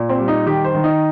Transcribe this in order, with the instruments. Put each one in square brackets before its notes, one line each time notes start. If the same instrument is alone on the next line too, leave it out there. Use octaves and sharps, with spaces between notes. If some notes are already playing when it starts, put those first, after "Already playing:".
Already playing: [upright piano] A#2
C4
G3
D#4
D#3 G4
C5
D#3
D#4